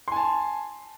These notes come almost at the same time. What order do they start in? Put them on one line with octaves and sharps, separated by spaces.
C6 G#5 A5